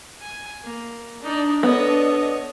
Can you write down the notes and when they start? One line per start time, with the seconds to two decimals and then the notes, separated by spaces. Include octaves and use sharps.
0.21 G#5
0.64 A#3
1.23 D4 D#4 D5
1.63 B3 D4 A4 C#5 D#5